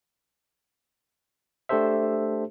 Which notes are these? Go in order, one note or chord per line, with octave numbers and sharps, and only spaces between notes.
A3 D4 G4 A4 C5 E5